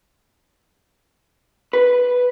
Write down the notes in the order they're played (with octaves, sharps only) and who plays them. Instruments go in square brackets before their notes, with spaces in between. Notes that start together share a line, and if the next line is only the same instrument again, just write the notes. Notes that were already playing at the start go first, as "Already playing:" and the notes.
[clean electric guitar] B4